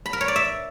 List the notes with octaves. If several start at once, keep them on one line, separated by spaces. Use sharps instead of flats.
B5
A#4
C#5
D5
E5